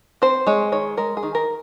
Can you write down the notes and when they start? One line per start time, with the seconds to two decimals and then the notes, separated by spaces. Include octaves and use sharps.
0.22 C4 C5
0.47 G#3 C#5
0.72 D#3 C#5
0.97 G#3 A#4
1.17 G#4
1.23 D#3
1.35 A#4